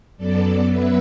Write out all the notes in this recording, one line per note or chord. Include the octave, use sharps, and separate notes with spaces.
F#2 F#3 B3 A4 D5
B4 E5